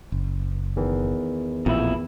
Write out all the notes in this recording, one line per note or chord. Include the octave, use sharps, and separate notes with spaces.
F#1
E2 D#3 E3
A1 F2 A#2 E4